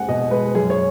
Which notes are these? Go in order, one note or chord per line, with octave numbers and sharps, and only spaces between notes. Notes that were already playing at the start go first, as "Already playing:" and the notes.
Already playing: G#3 F#5 G#5
B2 D#5
G#3 B4
F#2 G#4
C#5